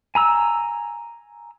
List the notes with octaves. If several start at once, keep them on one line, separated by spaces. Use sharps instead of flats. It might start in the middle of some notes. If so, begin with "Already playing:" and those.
G#5 A#5 E6